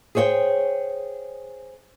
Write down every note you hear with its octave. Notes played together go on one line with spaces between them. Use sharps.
G#4 C5 C#5 F#5 G5